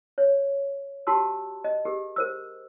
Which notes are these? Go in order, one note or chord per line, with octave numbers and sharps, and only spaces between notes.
C#5
F#4 G4 A5 C6 E6
D#5
G4 G#4 A#4
A#4 C5 E6